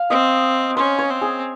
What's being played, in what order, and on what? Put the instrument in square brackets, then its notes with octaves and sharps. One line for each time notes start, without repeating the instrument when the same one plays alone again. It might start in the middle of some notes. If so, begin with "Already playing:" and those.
Already playing: [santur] F5
[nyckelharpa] C4 [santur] D#5
[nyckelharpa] C#4 [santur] C5
[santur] C#5
[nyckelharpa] C4
[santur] G#4